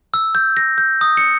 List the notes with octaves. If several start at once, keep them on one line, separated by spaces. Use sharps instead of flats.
E6
G6
A#6
G6
D#6
C#7